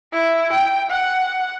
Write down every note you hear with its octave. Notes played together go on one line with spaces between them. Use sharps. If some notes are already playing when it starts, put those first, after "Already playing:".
E4
G5
F#5